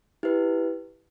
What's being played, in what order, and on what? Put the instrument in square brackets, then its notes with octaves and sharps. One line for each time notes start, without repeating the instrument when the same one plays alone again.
[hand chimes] E4 G4 B4